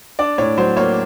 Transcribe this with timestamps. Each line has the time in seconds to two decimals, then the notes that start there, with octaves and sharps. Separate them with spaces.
0.19 D4 D5
0.38 A2 C#5
0.57 F#3 C5
0.77 A#3 C#5